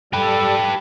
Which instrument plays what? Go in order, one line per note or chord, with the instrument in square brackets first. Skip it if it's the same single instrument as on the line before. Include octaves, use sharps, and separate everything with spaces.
[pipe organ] G3 A4 [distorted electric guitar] G4 B4